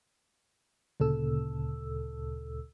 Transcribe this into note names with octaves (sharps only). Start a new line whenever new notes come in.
D2 A#2 C#3 A4 E6